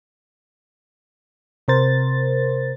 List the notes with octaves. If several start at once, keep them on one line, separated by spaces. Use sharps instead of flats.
C3 A#4 C5 A6